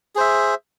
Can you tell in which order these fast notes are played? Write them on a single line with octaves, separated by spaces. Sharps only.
G#4 C5 E5